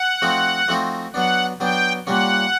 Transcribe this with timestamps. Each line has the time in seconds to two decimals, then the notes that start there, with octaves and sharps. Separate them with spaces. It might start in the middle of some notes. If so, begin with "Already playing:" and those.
Already playing: F#5
0.22 F3 A3 C4 D#4 F#4
0.68 F3 A3 C4 D#4 F#4
1.14 F#3 B3 D4 F#5
1.60 F#3 B3 D4 G5
2.06 A#2 G3 A#3 C#4 F#5